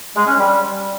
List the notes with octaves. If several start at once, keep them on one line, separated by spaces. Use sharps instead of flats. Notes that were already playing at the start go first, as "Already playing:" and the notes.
G#3
C#4
G3